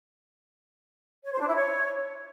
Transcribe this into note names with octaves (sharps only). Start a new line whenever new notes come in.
C#5
C5
D4
E4
C#5